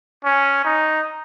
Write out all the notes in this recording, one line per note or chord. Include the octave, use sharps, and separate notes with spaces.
C#4
D#4